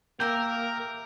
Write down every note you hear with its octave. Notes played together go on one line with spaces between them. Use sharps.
A#3 G4 A#4 E5 A#5 G6